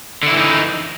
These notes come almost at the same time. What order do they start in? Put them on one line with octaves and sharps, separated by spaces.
D3 E4 E3 D#4